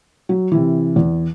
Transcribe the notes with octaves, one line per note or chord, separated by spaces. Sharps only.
F#3
C3 E3
E2